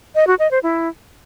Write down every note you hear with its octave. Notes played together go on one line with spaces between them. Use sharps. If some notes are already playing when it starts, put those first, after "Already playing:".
D#5
F#4
D#5
C5
E4